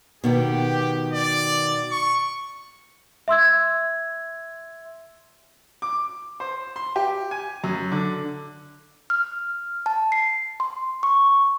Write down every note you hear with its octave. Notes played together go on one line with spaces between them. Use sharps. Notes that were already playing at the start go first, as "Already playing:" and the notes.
B2 D#3 B3 G4
D5
C#6
E5 C6 E6 G#6
D6
C5
C6
G4
G#5
F#2
D3
F6
A5
C7
C6
C#6